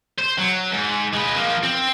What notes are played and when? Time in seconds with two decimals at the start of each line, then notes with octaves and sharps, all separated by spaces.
0.18 C5
0.38 F#3
0.72 G#2
1.14 G#3 B4
1.36 F3 A#3
1.63 C4